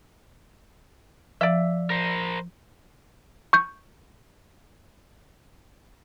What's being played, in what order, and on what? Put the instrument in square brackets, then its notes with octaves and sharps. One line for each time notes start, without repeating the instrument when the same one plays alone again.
[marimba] F3 [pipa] D5 E5
[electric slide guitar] A#4 C5
[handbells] C#6 G6